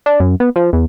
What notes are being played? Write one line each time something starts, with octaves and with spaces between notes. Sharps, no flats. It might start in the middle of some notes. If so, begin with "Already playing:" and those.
D4
F#2
B3
F3
E2